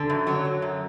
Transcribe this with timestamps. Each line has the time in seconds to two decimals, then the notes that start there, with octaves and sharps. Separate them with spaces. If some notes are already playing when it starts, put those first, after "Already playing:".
Already playing: D3
0.10 F#2
0.27 F#3 C#5
0.45 F#3
0.62 F#2